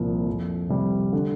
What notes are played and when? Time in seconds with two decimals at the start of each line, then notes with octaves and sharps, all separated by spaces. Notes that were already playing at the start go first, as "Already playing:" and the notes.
Already playing: C2 A#2 F3 A#3
0.26 F2
0.69 C3 G3
1.13 D3